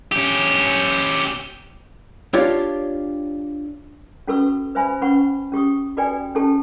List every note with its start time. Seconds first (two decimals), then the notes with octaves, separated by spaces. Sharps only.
0.12 C#4 G4
2.33 D4 F4 G4 C#5 D5
4.28 C#4 F#4 A4 B4 C#6 E6
4.75 B4 C5 E5 G#5 B5
5.02 C#4 B4 F#5 B5 C#6
5.52 C#4 G4 C#6 D#6
5.97 F#4 A4 B4 D5 G5 G#5
6.35 C#4 G4 A4 A5